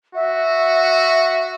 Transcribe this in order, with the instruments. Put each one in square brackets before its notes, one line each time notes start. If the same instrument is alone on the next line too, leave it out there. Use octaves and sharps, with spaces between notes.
[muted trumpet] F#4 [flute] E5